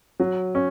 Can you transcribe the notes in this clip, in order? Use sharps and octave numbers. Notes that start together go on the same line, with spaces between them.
F#3
C#4